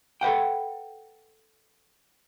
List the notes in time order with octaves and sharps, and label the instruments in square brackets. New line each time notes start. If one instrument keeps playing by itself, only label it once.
[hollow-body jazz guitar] A4 B4 F#5 G5